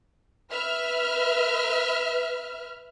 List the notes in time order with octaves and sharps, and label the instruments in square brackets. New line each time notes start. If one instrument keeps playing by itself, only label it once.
[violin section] B4 E5 F6